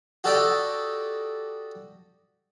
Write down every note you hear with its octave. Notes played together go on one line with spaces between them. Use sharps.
F#4 G4 A4 D5 D#5 G5